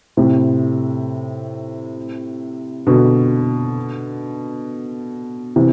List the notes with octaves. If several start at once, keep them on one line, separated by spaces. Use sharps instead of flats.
A2 C3
B2 D3
C3 E3